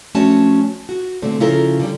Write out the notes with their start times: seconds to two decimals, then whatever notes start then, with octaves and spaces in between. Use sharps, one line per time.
0.15 F3 A3 C#4 D4 F#4 A5
0.89 F#4
1.22 A#2 D3 A3 C4
1.40 C#3 F3 E4 F4 A4 A#4
1.80 D3 G3